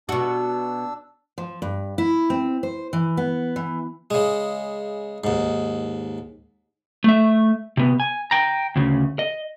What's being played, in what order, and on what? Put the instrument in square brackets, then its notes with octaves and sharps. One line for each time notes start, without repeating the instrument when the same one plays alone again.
[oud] B2 F#4 [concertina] D4 E6
[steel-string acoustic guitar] F3
G2
E4
C4
C5
E3
B3
E3
[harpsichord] C#3 G#3
D#2 G#2
[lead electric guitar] A3 E5
C3 B3
G#5
G5 A#5
D2 C#3
D#5